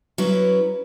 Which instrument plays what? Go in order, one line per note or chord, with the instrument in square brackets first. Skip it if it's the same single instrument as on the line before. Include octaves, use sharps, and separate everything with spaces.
[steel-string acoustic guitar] F#3 C#4 E4 B4